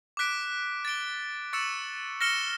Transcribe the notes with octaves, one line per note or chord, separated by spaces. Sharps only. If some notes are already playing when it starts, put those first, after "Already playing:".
D6 F#6 B6 D7
A6 D7 G7
C#6 E6 A6 C#7 E7
F6 A#6 C#7 E7 G7